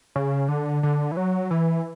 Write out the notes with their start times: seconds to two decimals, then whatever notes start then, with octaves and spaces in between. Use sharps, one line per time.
0.16 C#3
0.48 D3
0.83 D3
1.12 E3
1.17 F#3
1.51 E3